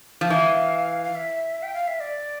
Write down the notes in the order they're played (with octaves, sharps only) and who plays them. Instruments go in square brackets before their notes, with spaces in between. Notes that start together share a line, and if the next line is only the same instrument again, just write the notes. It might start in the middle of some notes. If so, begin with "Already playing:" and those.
[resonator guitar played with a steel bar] F3
[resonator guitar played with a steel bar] E3 [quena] F5
[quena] F5
E5
G5
F5
E5
D5